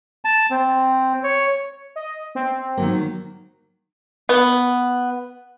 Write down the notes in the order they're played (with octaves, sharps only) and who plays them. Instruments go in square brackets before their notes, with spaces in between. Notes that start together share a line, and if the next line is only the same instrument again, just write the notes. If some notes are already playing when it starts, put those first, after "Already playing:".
[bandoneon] A5
C4
C#5
[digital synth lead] D#5
C4
[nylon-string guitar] D#3 F#3 A#3
[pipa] B3